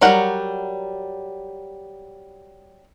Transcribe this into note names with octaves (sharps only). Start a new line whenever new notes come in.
F#3 G3 A#4 F#5